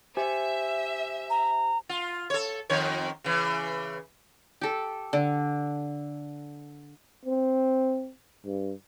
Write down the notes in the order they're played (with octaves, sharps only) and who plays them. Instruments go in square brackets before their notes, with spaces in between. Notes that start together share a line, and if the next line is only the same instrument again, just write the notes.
[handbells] G4 C5 G#5 [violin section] E5
[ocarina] A#5
[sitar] F4
A4 C#5
F2 D#3 C#5
C#3 E3
[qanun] G4 A4
D3
[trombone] C4
G2